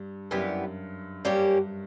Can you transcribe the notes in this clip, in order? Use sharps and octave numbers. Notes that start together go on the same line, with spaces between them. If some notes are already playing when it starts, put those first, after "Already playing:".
Already playing: G2
F#2 E3 G3 B3
G2 G3 A#3 C#4 G4